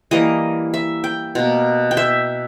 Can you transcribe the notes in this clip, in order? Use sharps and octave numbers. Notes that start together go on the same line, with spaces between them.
E3 G3 A#3 D#5
E5
G5
B2 A#3
G5
E5